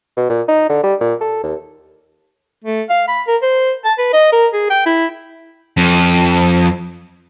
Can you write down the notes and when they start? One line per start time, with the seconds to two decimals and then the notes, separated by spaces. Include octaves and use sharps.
0.17 B2
0.30 A#2
0.49 D#4
0.70 D3
0.84 G3
1.01 A#2
1.21 A4
1.43 D#2
2.65 A3
2.89 F5
3.07 B5
3.27 A#4
3.42 C5
3.85 A5
3.98 B4
4.13 D#5
4.33 A#4
4.53 G#4
4.70 G5
4.86 E4
5.77 F2